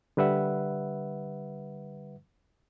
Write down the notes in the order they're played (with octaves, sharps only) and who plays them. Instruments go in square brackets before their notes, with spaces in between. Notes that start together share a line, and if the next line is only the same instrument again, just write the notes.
[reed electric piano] D3 G3 B4 E5 F#5